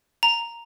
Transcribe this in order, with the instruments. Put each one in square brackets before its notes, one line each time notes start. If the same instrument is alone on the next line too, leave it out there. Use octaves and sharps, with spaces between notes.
[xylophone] A#5